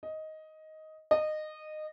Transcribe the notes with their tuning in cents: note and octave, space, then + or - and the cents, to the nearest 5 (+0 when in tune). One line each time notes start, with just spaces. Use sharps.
D#5 +10
D#5 -20